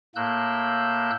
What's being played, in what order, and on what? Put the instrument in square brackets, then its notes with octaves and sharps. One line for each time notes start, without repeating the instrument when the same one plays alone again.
[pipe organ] A2 A#3 E6 F#6 G6